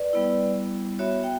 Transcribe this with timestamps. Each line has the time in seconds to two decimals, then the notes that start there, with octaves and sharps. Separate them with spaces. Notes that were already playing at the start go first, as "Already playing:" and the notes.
Already playing: B4 D5
0.13 G3 B3 E4
0.99 B3 F#4 C#5 E5
1.24 G5